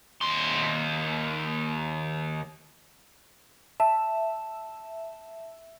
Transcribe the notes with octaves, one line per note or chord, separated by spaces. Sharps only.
D#2 C6
E5 A5